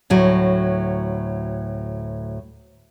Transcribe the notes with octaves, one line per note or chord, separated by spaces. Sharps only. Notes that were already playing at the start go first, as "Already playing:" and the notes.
D2 A2 F#3